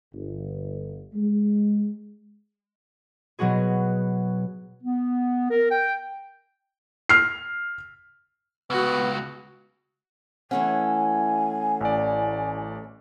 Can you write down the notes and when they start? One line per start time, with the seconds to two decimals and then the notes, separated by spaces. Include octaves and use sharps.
0.14 G1
1.14 G#3
3.39 B2 F#3 B3 F#4 G#4
4.83 B3
5.50 A#4
5.70 G5
7.09 F6 C7
8.70 C#2 B3 F#4
10.51 E3 A3 C#4 F#5 G#5
11.81 A1 D5